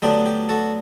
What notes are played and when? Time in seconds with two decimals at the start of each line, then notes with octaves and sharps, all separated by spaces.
0.02 D2 D3 F#3 B3 D4 G4
0.26 G4
0.49 F#4 A4